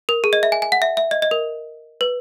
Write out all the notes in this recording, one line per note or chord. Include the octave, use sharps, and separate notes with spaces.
A#4
G#4
D#5
E5
G#5
G#5
F#5
E5
E5
D#5
D#5
A#4
B4